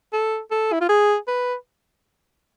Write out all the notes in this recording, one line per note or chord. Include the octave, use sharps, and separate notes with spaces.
A4
A4
E4
F4
G#4
B4